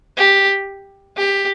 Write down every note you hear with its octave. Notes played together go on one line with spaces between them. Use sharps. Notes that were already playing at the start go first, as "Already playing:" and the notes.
G4
G4